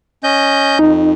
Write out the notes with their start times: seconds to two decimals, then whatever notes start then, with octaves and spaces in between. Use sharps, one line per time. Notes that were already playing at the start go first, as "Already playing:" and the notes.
0.24 C#4 D#5 G6
0.79 F2 D#4